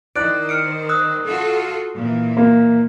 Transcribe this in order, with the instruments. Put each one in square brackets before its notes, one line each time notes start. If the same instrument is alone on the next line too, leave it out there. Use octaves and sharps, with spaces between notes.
[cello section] D#3 C5 [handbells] E4 F#6 D7 [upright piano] D5
[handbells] F6 C#7 D7
D#6 E6 F#6
[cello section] F4 F#4 A4
A#2 E3
[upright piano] A#3